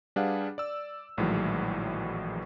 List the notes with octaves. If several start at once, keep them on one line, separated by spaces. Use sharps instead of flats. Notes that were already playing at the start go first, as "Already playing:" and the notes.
G3 D4 G#4 B4 F5 F#5
D5 E6
A#1 A2 D#3 E3 F#3 G#3